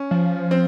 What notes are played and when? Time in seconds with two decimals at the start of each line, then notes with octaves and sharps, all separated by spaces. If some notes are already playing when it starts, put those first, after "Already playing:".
Already playing: C#4
0.11 F3
0.51 C4